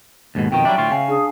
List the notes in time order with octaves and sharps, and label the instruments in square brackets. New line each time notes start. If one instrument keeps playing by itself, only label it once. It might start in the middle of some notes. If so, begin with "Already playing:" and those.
[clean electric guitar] D#2 G#2 B2
[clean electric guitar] F2 B2 D#3 [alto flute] G5
[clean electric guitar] F#3 G3 D4 [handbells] E5
[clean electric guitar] D2 A2 F4 [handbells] C#6
[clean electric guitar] C#3 [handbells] F5 G#5 C7
[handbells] D4 [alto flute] G#4